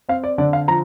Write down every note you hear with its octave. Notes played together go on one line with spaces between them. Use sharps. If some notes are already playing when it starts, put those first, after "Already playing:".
C4 F5
D5
D3 D5
F5
F3 A#5